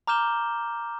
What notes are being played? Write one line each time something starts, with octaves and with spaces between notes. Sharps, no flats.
A#5 D6 F6 G6 E7 G7